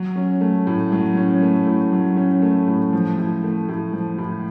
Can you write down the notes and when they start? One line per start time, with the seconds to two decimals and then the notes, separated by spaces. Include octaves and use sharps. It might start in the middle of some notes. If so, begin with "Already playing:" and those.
Already playing: F#3
0.16 C#4
0.41 A3
0.67 A2
0.92 F#3
1.17 C#4
1.42 A3
1.67 A2
1.92 F#3
2.17 C#4
2.42 A3
2.67 A2
2.93 F3
3.18 A2
3.44 A3
3.69 A2
3.93 F3
4.18 A2